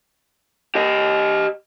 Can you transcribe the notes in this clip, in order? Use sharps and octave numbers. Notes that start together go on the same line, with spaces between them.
G4 D#5